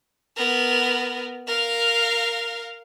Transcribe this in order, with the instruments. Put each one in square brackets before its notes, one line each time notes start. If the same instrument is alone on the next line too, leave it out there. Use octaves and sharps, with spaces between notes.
[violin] B3 A#4
A#4 F5